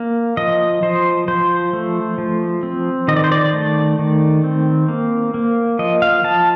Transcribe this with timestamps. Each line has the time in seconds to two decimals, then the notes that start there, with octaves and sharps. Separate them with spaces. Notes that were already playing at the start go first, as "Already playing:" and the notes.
Already playing: A#3
0.37 F3 D#5
0.82 F3 C5
1.28 F3 C5
1.73 A3
2.18 F3
2.63 C4
3.08 D#3 D#5
3.16 D5
3.24 C5
3.32 D5
3.53 A3
3.99 D#3
4.44 C4
4.88 A#3
5.34 A#3
5.79 F3 D#5
6.02 F5
6.24 F3 A5